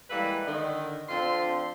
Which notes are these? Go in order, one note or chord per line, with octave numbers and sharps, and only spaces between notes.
E3 G3 G#3 A#3 A4 B4
D3 D#3
F3 C4 D4 A4 C6